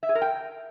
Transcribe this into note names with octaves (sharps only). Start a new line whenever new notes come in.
E5
G#4
A#4
G5